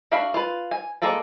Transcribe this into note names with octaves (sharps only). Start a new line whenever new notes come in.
A3 D4 F#4 F5 B5
F4 B4
G#5
G#3 A#3 G#4 A4 D5